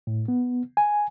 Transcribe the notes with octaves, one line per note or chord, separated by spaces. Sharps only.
A2
B3
G#5